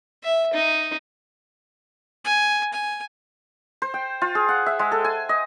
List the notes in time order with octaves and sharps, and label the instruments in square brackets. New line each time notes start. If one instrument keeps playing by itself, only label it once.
[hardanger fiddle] E5
D#4
[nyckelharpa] G#5
G#5
[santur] C5
G5
F4
G#4
F#5
E5
G#3
A4
G#5
D#5